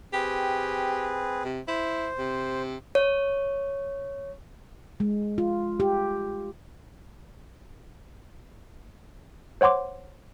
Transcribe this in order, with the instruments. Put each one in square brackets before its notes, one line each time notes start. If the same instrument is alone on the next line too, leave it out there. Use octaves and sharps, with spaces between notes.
[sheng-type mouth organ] C4 G#4 B4 [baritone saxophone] G4
[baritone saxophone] C3
[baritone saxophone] E4 [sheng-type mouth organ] C5
[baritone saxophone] C3
[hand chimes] C#5
[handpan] G#3
F4
G4
[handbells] C5 C#5 F#5 C6 D6